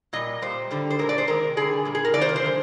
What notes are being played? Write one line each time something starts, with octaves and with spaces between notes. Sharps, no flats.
A#2 G3 D#5
A#2 G3 C5
D3 G3
C5
A#2 G#3 A#4
D5
C5
C3 D#3 G#3 A#4
D3 G3 G#4
A#2 G3
G#4
A#4
C3 D#3 G3 D5
C5
A#4
C5
D3 F3 G#3